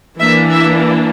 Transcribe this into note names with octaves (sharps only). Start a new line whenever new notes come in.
E3 A#3 D4 E5
E5